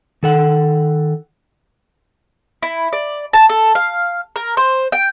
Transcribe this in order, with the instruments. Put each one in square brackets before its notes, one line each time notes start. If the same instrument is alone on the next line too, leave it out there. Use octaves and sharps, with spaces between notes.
[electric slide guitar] D#3 A4 F#5
[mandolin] E4
D5
A5
A4
F5
A#4
C5
G5